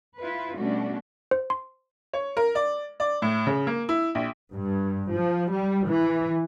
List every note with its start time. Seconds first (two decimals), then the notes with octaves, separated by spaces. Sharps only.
0.19 E4 F4 B4
0.57 B2 G3 A3 C#4 D4 F#4
1.31 C5
1.50 C6
2.13 C#5
2.37 A#4
2.55 D5
3.00 D5
3.22 A2
3.47 C#3
3.67 A#3
3.89 E4
4.15 A#1
4.52 G2
5.12 F3
5.51 G3
5.87 E3